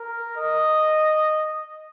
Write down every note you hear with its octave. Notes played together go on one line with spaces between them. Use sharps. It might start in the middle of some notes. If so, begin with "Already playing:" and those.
Already playing: A#4
D#5